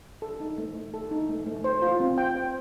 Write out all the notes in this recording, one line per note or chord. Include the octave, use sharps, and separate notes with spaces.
A4
D#4
A3
A3
A4
D#4
A3
A3
C5
F4
C4
G5
C5